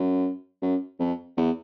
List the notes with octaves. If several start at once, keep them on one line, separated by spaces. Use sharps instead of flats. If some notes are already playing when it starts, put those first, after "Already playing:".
Already playing: F#2
F#2
F2
E2